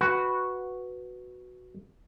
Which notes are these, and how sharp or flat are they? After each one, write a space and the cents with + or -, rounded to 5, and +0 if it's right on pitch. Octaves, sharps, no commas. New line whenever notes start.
F#4 +0 B4 +0